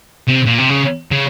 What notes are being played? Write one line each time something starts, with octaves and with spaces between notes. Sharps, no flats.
C3
A#2
C3
C#3
C#3